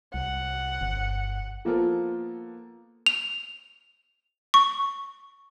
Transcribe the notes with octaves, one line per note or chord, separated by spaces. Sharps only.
C2 F#5
G1
F3 A#3 B3 F4 A4 A#4
F7
C#6